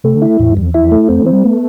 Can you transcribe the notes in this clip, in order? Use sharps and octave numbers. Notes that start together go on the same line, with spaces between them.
C3 A3
D3
E4
E2 A2
G2
E2
F2
F2 E4
A3
F2 C4
E3
C4
G3
A3 B3